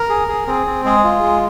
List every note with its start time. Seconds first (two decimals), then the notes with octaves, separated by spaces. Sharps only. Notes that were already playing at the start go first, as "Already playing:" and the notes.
Already playing: A#4
0.10 G#4
0.28 G#4
0.47 C4 G#4
0.66 C4
0.85 G#3 G#4
1.04 F4
1.23 G#3